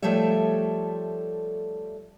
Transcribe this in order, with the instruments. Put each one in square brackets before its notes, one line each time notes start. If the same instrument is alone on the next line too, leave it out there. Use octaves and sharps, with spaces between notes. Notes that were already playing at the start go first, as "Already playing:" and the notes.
[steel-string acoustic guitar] F3 G3 A3 A4 C#5 E5